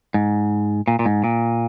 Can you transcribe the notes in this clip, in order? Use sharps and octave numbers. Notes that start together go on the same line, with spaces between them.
G#2
A#2
A#2
G#2
A#2